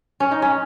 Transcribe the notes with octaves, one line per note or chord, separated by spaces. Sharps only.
C#4
D#4
C#4